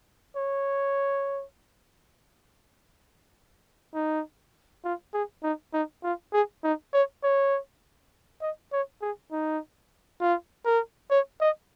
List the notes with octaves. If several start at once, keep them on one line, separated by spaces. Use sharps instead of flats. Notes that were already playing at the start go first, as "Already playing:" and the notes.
C#5
D#4
F4
G#4
D#4
D#4
F4
G#4
D#4
C#5
C#5
D#5
C#5
G#4
D#4
F4
A#4
C#5
D#5